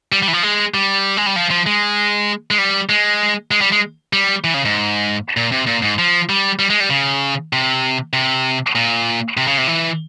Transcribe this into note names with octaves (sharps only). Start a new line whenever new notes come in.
G3
G3
E3
F3
G#3
G3
G#3
G3
F3
F3
G#3
G#3
G3
G#3
G#3
G3
G#3
G3
E3
C#3
G#2
A#2
C3
A#2
G#2
F3
G3
G3
G#3
G3
C#3
C3
C3
A#2
C3
C#3
C3
E3